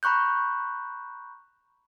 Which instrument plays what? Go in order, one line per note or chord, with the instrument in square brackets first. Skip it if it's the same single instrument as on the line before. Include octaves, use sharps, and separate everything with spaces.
[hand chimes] A#5 B5 C#6 F#6 G6